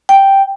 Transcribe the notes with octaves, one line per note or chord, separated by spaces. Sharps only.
G5